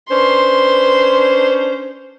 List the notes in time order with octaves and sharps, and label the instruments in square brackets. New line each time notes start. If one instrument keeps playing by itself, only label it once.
[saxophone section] C#4 D4 C5 [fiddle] B4 C6